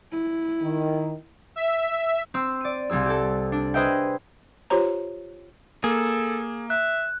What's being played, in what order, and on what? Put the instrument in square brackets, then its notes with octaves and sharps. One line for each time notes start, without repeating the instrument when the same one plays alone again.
[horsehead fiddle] E4
[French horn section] D#3
[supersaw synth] E5
[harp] C4 E6
D5 D#7
C2 G3 C4 G#4 E6
G4 A4
D4
G#4 B4 C5 D#5 E5 G5
[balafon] F4 G4 C5 C#5 A#5
[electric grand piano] A#3 [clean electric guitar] G#4 [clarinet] A4
[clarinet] E5 [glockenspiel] F#6